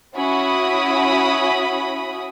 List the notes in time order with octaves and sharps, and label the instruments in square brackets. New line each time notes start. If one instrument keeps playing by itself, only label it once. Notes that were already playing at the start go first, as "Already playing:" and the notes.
[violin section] C#4 E4 F#4 B5 D#6